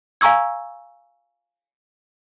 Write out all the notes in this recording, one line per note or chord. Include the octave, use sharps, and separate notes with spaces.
F5 G#5 A#5 C#6 E6 G#6